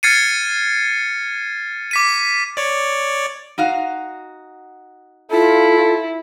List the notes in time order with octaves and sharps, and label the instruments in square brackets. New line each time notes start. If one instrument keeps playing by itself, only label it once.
[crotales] F6 G#6 A6 C7 C#7 D#7
D6 B6 D#7
[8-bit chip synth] C#5 D5
[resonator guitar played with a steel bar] D#4 F#4 F5
[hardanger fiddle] E4 [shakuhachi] F4 [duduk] A4